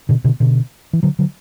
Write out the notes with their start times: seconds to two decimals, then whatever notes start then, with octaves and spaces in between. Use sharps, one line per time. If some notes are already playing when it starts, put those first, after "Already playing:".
0.09 B2 D3
0.24 B2 D3
0.40 B2 D3
0.93 E3
1.03 D3 F#3
1.19 D3 F#3